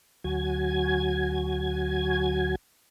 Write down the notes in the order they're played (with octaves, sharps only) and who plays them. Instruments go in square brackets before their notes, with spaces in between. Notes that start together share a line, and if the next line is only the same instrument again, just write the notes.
[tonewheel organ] D2 F#3 F#4 G#5 G#6